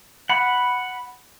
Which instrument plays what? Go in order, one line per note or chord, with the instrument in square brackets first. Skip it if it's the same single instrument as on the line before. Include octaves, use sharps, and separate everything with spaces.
[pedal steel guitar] F#5 B5